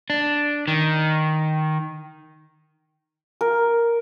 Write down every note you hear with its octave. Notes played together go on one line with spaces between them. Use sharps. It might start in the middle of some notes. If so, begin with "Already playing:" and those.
D4
D#3
A#4